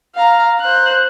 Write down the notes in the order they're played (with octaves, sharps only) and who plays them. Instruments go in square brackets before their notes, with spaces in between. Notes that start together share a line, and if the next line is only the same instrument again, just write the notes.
[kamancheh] F5 A#5
C5 F#6